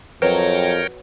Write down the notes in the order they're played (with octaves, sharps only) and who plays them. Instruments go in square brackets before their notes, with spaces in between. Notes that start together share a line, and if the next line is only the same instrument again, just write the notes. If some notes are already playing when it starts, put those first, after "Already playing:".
[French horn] F2 [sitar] F#3 [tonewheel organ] A#4 C#5 G5 [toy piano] B4